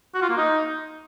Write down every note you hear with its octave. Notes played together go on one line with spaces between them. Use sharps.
F#4
F4
A#3
D#4